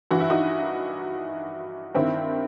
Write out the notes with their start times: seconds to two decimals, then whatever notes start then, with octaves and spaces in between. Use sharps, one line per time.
0.11 G2 E3 F#4
0.20 E4
0.30 D#4 F#4
1.95 G2 D#3 C4 E4